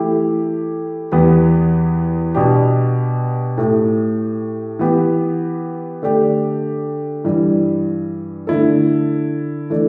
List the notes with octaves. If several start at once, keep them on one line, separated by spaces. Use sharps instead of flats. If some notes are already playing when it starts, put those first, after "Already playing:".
Already playing: E3 A3 E4 G4
E2 E3 B3 G4
B2 B3 D4 G4
A2 A3 G4
E3 B3 G4
D3 A3 D4 G4
G2 E3 G3
D3 A3 E4 A4
E3 A3 D4